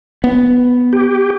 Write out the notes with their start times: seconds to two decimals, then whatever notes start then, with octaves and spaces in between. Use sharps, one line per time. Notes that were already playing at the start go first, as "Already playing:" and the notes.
0.24 B3
0.93 G4